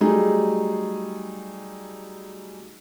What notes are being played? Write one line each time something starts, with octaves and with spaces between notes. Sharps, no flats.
F#3 G3 A3 D#4 G#4